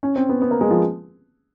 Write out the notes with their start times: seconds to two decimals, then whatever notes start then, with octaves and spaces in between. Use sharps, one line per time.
0.03 C#4
0.16 C4
0.29 B3
0.42 B3
0.51 A#3
0.61 G#3
0.71 F3